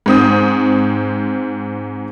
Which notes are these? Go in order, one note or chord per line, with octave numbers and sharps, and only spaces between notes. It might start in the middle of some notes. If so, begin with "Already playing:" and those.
G#2 C4 D#6